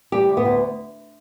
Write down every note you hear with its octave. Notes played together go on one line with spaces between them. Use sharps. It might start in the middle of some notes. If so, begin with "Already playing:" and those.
G3 G4
D2
B3
D2